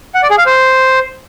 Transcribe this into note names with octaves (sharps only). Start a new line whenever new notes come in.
F#5
D5
G#4
F5
C5